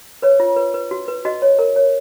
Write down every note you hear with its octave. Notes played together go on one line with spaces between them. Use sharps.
B4 C#5
F4
B4
B4
F#4
B4
F#4 D#5
C#5
A#4
C#5